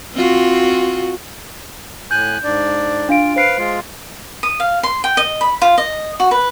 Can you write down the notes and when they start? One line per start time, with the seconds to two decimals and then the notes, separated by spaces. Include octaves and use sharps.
0.14 C4 F4 F#4
2.11 A2 G#5 F#6 G6
2.44 G#2 D4 D5
3.09 D4 F4 F5 D7
3.36 B4 C5 F5 C7 D7
3.58 G#3 F4
4.43 D#6
4.60 F5
4.83 C6
5.04 G5
5.17 D#5
5.41 B5
5.62 F4
5.78 D#5
6.20 F#4
6.31 B4